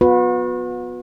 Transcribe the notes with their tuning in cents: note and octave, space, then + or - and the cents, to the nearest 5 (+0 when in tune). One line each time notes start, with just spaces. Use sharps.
B3 +0 F#4 -40 B4 +0